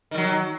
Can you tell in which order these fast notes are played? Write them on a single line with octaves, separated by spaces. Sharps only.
D#3 G3 F#3